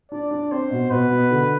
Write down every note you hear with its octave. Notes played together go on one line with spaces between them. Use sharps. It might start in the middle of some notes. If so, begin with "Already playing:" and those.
D4 D5
D4
C4 C5
B2
B2 B4
B2
D3